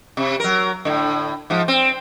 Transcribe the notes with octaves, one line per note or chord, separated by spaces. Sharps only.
C3
F#3 A#4
A2 D3
G#2 F3
C4